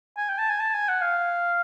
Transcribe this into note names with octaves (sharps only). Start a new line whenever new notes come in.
G#5
G5
A5
G#5
A5
G#5
F#5
F5